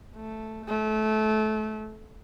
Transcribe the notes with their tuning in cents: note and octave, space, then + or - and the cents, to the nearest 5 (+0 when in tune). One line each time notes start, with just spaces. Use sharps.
A3 +0
A3 -25